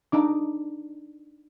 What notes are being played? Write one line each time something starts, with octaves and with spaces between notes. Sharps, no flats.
D4 D#4 D6